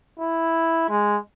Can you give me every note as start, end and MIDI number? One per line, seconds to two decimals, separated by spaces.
0.20 0.86 64
0.89 1.17 56